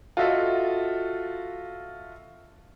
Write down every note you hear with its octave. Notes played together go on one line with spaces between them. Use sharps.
F4 F#4 A4 D#5 E5